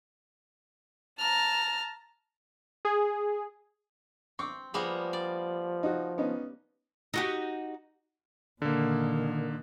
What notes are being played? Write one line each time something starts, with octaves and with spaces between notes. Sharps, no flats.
A5 A#5 F6
G#4
C4 C#6 D6
F3 G3 A#3 B3 G#4
D5
D#4 F#4
B3 C#4 D#4
D#4 F#4 G4
A#2 D3 D#3 A#3